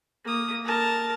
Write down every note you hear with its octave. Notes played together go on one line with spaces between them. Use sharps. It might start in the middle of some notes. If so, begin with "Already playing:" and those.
A#3 D#6
A#4 A5